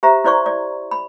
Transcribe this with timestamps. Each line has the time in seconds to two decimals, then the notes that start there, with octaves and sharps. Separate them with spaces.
0.03 G4 C5 E5 A#5
0.24 E4 C5 D5 C6 C#6
0.46 D5
0.91 B5